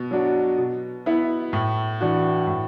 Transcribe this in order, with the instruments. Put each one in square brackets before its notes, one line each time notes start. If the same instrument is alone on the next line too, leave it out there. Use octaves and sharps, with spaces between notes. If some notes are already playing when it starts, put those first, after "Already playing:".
Already playing: [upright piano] B2
F#3 D4 F#4
B2
B3 E4
A2
E3 D4 F#4
A2